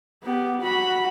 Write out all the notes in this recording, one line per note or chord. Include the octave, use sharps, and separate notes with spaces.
B3 G4
F#4 B5